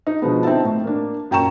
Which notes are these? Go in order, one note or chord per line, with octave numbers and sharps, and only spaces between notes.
D#4
B2 D3 F3 G#3 B3
C4 D#4 E5 A5
A2
A#3 D4
F#2 A#2 G5 A#5 C#6 E7